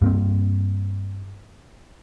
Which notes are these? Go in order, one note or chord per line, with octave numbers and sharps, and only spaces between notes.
G2 A#3 C4